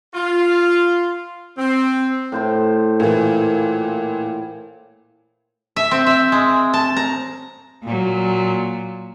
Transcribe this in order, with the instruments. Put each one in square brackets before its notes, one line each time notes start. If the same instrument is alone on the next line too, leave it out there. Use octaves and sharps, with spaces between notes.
[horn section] F4
C4
[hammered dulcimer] A2 C5 C6
[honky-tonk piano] A#2 E3
[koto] E5
C4
E5
G#3
A5
A#5
[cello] A#2 F#3